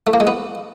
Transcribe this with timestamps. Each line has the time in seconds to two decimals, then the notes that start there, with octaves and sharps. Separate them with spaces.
0.07 A3
0.13 A#3
0.20 G#3
0.27 B3